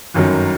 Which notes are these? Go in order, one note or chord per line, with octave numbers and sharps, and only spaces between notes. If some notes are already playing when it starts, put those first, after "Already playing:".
G1 F#2 D#3 F#3